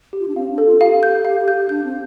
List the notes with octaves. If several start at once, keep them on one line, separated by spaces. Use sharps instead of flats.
G4
F4
D4
C4 F5
D4
A4
F4
G4 F5
G4 G6
G4 F5
G4
G6
G4
D4 G6
C4